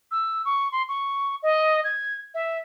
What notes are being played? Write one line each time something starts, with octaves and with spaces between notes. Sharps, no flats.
E6
C#6
C6
C#6
D#5
G#6
E5